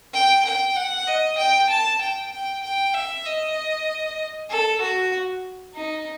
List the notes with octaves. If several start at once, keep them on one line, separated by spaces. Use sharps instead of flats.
G5
G5
F#5
D#5
G5
A5
G5
G5
G5
E5
D#5
A4
F#4
D#4